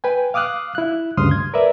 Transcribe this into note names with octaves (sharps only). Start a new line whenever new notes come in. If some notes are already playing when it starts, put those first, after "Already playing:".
B4 G5 G#5
F5 D6 D#6 F6 F#6
E4 F#6
D2 G2 C#3 C6 D#6 F6
G#6
A#4 B4 D5 E5